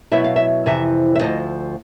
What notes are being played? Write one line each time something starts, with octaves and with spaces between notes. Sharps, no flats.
B2 F#3 B3 E4 E5
F5
E5
F2 C3 E3 E5
E5
D2 C#3 F3 D#5